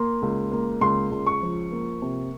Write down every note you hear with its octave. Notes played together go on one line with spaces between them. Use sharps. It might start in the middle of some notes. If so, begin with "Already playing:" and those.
Already playing: A#3 C6
C#2
A#3
C#2 C6
C#2
C#6
F3
A#3
C3